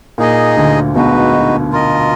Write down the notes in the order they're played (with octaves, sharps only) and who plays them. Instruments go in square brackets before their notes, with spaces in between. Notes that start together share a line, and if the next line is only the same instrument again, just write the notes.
[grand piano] A#2 [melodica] D#4 G#4 D#5
[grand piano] D2 D3
[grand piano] B1 B2 [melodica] G#3 D#4 F#4 B4
[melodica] F4 A#4 D#5